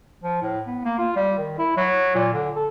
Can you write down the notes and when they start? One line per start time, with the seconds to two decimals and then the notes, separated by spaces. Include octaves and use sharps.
0.24 F3
0.42 A2
0.67 B3
0.85 A#3
0.98 F4
1.16 G3
1.38 D#3
1.58 E4
1.77 F#3
2.15 A#2
2.33 D3
2.56 A4